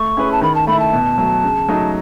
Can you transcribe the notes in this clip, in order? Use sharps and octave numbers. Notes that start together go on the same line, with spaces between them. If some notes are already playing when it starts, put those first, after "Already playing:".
Already playing: A3 C#6
C#4 E4 G#4 B4
A5
D#3 B5
A5
A3 E4 B5
A5
B2
F#3 A3
C#3
F#3 A3 D#4